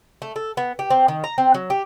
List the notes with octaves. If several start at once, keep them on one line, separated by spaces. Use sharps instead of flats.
A3
A4
B3
G4
C4
D#3
A#5
C4
F#3
G4